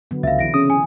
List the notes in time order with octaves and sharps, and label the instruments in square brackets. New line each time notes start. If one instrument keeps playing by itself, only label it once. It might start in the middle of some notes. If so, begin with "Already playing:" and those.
[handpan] D3 F#3 B3
[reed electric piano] C#2 [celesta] E5 F5
[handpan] C3 E3 E4 [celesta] A#6 D7
[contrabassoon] C#3 [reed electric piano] D#6
[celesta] G#5